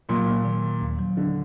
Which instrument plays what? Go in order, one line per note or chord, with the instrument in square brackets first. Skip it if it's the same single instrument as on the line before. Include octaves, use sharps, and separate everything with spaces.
[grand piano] A#2 [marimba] F#3
[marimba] A#3
D#3
D#3
D#2
F#3
[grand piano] D3 [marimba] F#3